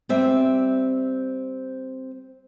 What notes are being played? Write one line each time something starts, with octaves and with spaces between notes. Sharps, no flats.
G3 C4 E5